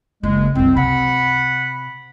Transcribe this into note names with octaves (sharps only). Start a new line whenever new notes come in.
F#1 G#3
C2 F#2 C4
C3 F#5 B5